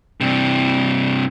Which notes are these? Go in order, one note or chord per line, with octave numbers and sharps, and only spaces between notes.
G2 C3